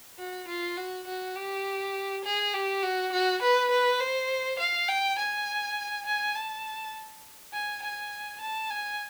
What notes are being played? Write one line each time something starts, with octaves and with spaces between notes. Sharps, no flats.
F#4
F4
F#4
F#4
G4
G#4
G4
F#4
F#4
B4
B4
C5
F5
G5
G#5
G#5
A5
G#5
G#5
A5
G#5